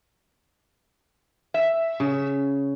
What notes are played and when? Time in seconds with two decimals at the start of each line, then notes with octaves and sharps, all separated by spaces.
1.54 E5
2.00 C#3